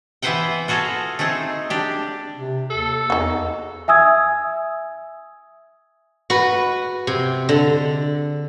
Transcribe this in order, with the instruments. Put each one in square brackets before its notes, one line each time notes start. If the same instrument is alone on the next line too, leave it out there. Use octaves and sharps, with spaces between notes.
[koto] E3 B3 B4 C5 F#5 G5
F4 F#4 G#4 A4 F5
A3 C4 D#4 G#4
D4 G4
[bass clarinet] C3
[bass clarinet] D#2 [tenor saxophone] A4
[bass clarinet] E2 [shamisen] D#4 F#4
[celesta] E5 G#5 D#6 E6 G#6
[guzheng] F#4 B4
C3
D3